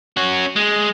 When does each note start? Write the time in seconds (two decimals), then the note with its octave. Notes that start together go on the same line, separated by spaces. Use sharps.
0.17 C#4 F#4
0.56 G#3